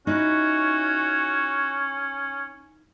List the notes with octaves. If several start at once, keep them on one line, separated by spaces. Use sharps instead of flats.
C#4 D#4 E4 F#4